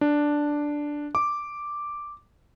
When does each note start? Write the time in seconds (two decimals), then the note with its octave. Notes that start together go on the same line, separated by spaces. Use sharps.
0.01 D4
1.15 D6